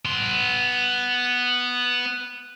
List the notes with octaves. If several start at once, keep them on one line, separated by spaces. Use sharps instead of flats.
B3 C6